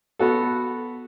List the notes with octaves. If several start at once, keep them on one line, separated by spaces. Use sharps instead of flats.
B3 F#4 A4